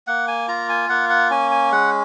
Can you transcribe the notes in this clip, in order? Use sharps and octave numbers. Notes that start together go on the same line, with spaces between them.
A#3 F#5
G#5
F4 A#5
G#5
A#3 F#5
F#5
C#4 G#5
G#5
G#3 F#5